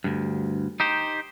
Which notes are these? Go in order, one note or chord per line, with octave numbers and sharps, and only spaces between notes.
D2 G2
D#4 G4 C5